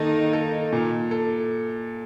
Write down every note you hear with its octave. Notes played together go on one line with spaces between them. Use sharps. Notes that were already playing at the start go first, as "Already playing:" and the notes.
Already playing: D#3 A#3 D#4 A4
A4
A#2
A4